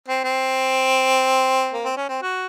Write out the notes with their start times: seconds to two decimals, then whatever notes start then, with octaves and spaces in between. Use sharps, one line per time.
0.08 C4
0.24 C4
1.72 A#3
1.85 C4
1.97 C#4
2.09 C4
2.22 F#4